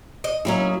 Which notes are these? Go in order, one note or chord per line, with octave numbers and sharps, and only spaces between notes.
D#5
F#3 A#3 C#4 D#4 E4 G#4